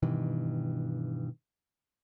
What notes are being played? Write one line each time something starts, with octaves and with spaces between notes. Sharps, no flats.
G2 B2 D#3 E3